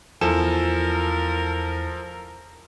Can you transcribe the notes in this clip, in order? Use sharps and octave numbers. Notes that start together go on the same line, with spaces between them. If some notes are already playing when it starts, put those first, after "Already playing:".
E2 F3 E4 A4 A#4 G#5 E7